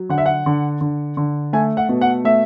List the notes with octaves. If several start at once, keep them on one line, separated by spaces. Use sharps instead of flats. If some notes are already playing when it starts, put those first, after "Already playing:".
Already playing: F#3
D3 F#5
E5
F#5
D3
D3
D3
A3 G#5
F#5
B2
F#5
A3 E5